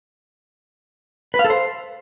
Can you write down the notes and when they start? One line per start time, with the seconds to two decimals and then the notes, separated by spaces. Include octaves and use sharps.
1.34 B4
1.39 F5
1.45 A4
1.50 C5